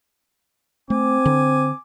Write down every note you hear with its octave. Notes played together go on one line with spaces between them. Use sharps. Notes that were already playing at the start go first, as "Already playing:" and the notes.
A3 C4 G#5 D6
D3